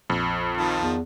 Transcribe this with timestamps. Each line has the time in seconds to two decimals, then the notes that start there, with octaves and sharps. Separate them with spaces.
0.10 A#1 F2
0.57 D#3 F3 A5
0.78 E2